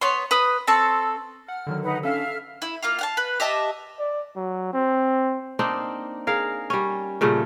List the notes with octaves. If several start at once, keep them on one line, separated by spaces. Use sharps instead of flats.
B3 C#5 C6
B4 D#6
C4 A4 A5 C#6
F#5 F6
D3 D#3 F#3
D#4 B4 F#5
C#4 D4 A4 E5 F5 F6
A4
E4
A#3 F4 F5
F5 F#5 A5
B4
G4 D#5 E5 A5
D5
F#3
C4
A#3 C4 D4 D#4
G#4 A#4 F5
G3 C#4
A#2 C#3 G3 A3